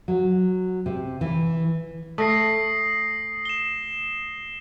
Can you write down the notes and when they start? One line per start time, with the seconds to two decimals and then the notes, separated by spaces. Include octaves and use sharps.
0.08 F#3
0.86 C3
1.21 E3
2.18 A3 D#6 A#6 C7
3.45 E7 G7